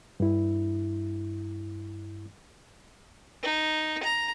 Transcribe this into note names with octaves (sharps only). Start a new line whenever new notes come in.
G2 E4
D#4
A#5